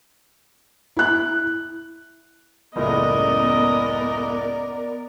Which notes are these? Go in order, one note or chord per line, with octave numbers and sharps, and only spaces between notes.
E4 F#6
F#1 C#2 A2 B3 A#4 D5 D#5